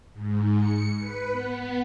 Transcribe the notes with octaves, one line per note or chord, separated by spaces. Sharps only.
G#2
C#7
B4
B3